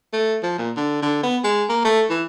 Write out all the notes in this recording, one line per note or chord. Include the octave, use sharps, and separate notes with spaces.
A3
F3
A#2
D3
D3
B3
G#3
A#3
A3
E3